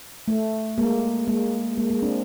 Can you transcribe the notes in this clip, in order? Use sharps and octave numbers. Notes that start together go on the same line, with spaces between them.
A3
G#3 A#3
G#3 A#3
G#3 A#3
G#3 A#3
C4 D4